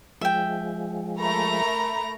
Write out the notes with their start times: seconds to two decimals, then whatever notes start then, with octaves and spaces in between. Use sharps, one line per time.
0.21 F3 G#3 E5 G5
1.18 A3 A#4 A#5 B5